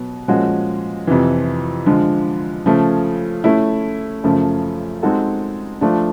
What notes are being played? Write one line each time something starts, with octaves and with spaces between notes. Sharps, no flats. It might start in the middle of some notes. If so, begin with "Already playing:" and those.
Already playing: B2 F#3 B3
A#2 F3 G#3 C#4 F#4
F2 C3 E3
D3 F3 G#3
C#3 F3 A3
A3 C#4 E4
F#2 C#3 F3 A3
G#3 C4 D#4 F#4 A4
F3 A3 D4 F4